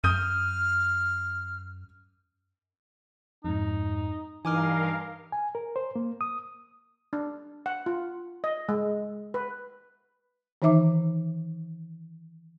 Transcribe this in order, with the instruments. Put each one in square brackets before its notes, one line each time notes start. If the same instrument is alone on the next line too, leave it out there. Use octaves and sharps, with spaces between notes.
[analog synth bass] F#2 [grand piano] D#6 G6 D#7 [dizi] F6
[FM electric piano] F2 G#2 [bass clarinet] D#4
[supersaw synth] G2 A#4 F5 [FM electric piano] E3 [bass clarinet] D#4 [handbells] G#5 D6 F6
[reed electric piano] G#5
A#4
C5
A#3
D#6
[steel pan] D4
F#5
F4
D#5
G#3
B4
[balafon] D#3 E3 D#4 E5 D6